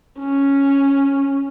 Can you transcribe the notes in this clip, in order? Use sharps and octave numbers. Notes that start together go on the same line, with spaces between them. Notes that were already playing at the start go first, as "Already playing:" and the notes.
C#4